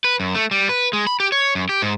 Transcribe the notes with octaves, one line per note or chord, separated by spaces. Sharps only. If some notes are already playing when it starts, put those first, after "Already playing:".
B4
F#2
A3
G3
B4
G#3
B5
G4
C#5
F#2
G4
G#2